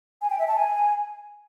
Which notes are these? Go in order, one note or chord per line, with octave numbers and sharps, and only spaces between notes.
G#5
G5
E5
A5
G#5